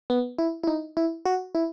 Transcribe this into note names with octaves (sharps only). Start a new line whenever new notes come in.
B3
E4
E4
D#4
E4
F#4
E4